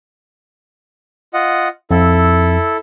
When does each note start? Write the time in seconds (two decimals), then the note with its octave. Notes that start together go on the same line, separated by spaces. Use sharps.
1.34 F4 D#5 F#5
1.91 F2 E4 A4